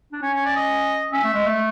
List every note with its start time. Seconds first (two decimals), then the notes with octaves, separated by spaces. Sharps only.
0.12 D4
0.22 C#4 C#5
0.34 C#5
0.45 D5
0.56 D#5
1.12 C#4 E5
1.24 A3
1.34 G#3
1.46 A3